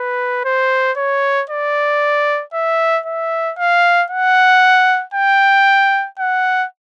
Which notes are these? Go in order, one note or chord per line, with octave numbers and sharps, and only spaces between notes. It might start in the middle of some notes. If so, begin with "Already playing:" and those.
Already playing: B4
C5
C#5
D5
E5
E5
F5
F#5
G5
F#5